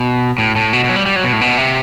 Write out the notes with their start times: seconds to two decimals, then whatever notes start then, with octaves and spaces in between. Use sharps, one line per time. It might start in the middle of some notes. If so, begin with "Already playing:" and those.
Already playing: B2
0.38 A2
0.56 A2
0.73 B2
0.84 B2
0.90 F#3
0.96 G3
1.06 G3
1.16 F#3
1.24 B2
1.33 A2
1.41 B2
1.58 C3